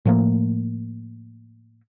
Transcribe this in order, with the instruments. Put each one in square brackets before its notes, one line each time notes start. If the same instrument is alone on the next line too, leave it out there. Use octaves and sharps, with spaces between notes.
[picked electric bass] A2 F3 A3 A#3